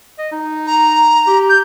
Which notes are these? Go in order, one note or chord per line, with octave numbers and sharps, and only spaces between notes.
D#5
D#4
A#5
G4
G6